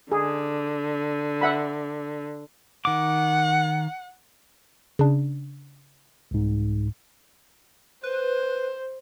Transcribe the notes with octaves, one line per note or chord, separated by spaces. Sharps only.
D3 G#4
E5 F#5 B5
D#3 F#5 D6
C#3 D4
C2 G#2
B4 C5